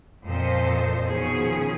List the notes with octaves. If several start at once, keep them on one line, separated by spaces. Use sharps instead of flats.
F2 A#2 A4 C5 D#5
B2 D#3 F3 C#4 G#4